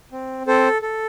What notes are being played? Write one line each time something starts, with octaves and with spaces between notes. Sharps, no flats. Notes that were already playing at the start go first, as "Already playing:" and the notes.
C4
C4 A4 C5
A4